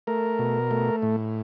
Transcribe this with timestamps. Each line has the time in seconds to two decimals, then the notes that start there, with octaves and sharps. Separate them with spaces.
0.07 A3 A#4
0.39 B2
0.71 A3
1.02 A2